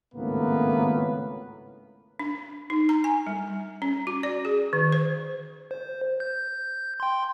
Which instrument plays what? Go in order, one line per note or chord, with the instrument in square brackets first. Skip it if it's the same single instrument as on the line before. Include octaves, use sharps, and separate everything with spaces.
[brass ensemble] G#1 C#2 A2 A#3 B3 B4
[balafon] D4
D#4
A#5
G#5
G3
C#4
F#4
D5
G#4
D#3
C5
[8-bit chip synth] C5
G6
G5 C6